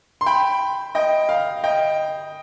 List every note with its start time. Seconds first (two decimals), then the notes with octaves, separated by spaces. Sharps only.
0.21 C6
0.26 G5 B5
0.95 D#5 G5
1.29 F5
1.64 D#5 G5